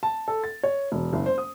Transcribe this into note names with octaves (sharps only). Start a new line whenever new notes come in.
A5
A4
A6
C#5
E1
F#1
C5
D#6